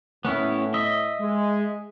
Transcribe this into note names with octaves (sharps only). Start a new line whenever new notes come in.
A2 B3 C#4 E4
D#5 E5
G#3